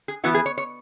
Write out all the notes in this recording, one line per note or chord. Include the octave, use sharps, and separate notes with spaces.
G#4
E3 B3 E4 F#4
G#4
C#5
C#5